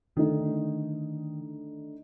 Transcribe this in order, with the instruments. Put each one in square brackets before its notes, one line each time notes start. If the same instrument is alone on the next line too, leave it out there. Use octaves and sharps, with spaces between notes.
[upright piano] D3 A3 D#4 [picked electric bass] D#3